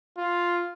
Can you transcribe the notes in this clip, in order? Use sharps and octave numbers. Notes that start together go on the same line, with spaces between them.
F4